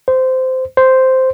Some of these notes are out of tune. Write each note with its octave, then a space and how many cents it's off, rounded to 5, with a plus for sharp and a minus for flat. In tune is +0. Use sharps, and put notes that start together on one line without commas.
C5 -15
C5 -5